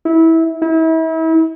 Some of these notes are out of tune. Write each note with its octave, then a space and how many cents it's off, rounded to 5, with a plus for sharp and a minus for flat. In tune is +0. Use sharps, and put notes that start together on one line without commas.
E4 -20
E4 -35